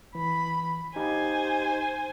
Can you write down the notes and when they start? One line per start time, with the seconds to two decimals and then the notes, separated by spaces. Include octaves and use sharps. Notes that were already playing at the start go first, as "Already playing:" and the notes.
0.15 E3 B5
0.96 D#4 G4 C5 G#5